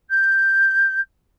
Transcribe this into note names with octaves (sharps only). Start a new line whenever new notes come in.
G6